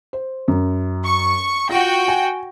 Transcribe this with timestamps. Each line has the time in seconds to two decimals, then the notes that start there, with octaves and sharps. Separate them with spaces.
0.13 C5
0.48 F#2
1.04 C#6
1.69 F4 F#4 G5 A#6
2.08 G#5